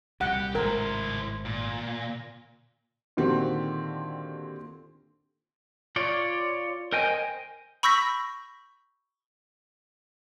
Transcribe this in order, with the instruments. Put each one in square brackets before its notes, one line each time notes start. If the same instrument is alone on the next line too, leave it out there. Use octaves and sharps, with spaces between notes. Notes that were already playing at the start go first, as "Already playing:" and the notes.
[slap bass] C2 A#2 [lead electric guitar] G4 [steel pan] F#5
[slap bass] G#1 A2 G#3 [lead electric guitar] E4 C5 [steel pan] A#4
[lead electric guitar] A#2
[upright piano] A#2 D3 D#3 C4 F#4 G4
[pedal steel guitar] F4 C#5 D5
A#4 C5 D#5 G5 G#5
[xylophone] B5 C#6 E6 G6 A#6 B6